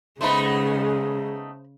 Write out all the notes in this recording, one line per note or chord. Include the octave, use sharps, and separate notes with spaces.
C#3 G#3 A3 B3 D#4 C5 B5